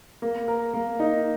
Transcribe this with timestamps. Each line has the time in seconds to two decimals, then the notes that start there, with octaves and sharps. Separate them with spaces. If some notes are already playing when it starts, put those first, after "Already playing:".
0.22 A#3
0.48 A#4
0.74 A#3
1.00 D#4